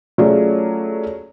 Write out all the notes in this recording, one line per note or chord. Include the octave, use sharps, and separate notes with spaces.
F#3 A3 C#4 F4 G#4 D5